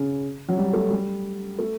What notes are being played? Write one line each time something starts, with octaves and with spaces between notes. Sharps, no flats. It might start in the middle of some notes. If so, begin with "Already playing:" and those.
Already playing: C#3
F#3
G3
A3
G3
A3